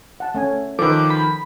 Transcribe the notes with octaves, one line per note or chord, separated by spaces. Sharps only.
F#5 A5
A3 C#4 G#5
D#3 F3 A4 B4 D6
B5